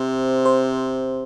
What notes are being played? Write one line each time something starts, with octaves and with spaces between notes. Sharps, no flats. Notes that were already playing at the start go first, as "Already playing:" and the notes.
Already playing: C3 C5
C5